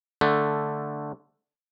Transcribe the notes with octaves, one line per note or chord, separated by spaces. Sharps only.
D3 A3